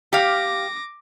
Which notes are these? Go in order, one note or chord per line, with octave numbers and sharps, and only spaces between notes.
G4 F5 D6 A#6